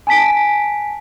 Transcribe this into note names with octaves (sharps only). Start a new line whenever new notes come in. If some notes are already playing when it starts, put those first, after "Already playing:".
G#5 A5 B6 D7